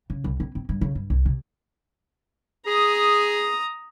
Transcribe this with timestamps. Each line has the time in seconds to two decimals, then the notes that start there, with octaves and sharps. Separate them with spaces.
0.10 C#3
0.24 C2
0.40 C4
0.55 C4
0.69 G2
0.81 C#3
0.95 G2
1.10 C2
1.26 C3
2.66 G#4 A#5 D#6